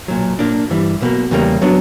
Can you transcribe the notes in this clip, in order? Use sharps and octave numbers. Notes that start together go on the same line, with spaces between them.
B1 A#2 F#3
A#2 A#3 D4
G2 E3 G3
B1 B2 A#3
E2 C#3 G3 A#3
F#3 B3 D4